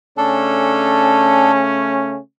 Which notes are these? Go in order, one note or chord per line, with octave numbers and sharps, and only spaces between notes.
C#3 A3 C#4 D4 A4